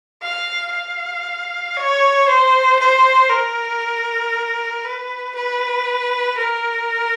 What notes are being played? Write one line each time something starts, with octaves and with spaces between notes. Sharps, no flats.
F5
F5
C#5
C5
C5
A#4
B4
B4
A#4